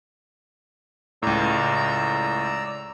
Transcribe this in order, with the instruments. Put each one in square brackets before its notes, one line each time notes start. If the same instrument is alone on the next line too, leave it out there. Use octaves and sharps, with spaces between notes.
[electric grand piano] C#2 A2 [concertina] D5 A#5 E6